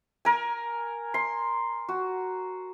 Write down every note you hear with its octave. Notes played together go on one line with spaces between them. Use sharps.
A#4 G#5
C6
F#4